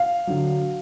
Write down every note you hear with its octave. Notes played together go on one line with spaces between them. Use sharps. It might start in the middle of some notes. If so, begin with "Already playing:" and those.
Already playing: F5
D3 F#3